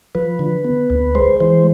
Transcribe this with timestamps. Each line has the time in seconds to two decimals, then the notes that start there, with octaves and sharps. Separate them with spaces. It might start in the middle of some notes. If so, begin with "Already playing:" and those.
0.15 F3 B4
0.39 D3
0.64 B3
0.90 D2
1.15 G#3 C5
1.40 E3 C5